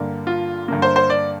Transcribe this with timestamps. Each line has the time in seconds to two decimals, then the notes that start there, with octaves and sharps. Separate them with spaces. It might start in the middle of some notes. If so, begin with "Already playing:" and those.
Already playing: G2 D3 A#3
0.27 F4
0.68 G2 D3 A#3
0.82 C5
0.96 C5
1.10 D5